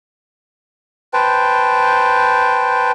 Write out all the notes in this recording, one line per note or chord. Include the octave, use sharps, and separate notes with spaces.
B4 C5 G5 A5